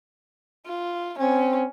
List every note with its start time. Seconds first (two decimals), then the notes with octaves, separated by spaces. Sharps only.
0.67 F4
1.19 C4 C#4